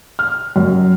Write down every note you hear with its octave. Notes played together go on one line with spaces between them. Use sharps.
F6
F#2